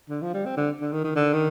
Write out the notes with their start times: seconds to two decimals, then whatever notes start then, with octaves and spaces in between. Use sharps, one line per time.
0.10 D3
0.22 F3
0.33 G3
0.46 C4
0.57 D3
0.81 D3
0.92 D#3
1.04 D#3
1.16 D3
1.33 D#3